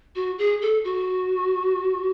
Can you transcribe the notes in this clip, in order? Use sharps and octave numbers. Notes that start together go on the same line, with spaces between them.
F#4
G#4
A4
F#4